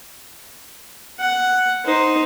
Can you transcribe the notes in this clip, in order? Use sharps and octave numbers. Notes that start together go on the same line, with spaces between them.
F#5
D#4 C5